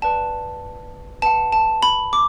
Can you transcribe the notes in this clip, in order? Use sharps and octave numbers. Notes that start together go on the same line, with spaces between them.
B4 D5 F#5 A5
B4 F#5 A5
A5
B5
D6